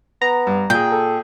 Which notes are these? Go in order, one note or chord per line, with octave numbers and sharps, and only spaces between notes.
B3 A#5
G2
A#2 G#4 G5
A4